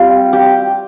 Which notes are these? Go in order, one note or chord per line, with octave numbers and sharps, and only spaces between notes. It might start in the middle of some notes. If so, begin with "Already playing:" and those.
Already playing: G3 C4 F4 G4
G4